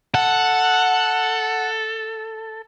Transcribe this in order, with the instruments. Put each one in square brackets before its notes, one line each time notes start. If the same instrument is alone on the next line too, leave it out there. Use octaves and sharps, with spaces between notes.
[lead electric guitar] A4 [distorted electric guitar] F#5